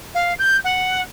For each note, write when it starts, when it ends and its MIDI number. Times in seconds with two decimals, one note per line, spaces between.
0.14 0.33 77
0.38 0.57 91
0.64 1.01 78